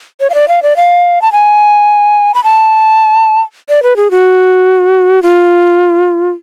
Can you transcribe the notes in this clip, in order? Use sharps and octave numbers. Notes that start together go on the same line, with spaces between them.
C#5
F5
D5
F5
D5
F5
A5
G#5
B5
A5
D5
B4
G#4
F#4
F4